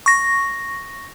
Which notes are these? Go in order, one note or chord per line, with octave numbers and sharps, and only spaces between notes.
C#6 A#6